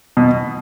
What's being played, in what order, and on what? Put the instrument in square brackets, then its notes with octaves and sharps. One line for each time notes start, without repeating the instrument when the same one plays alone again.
[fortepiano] B2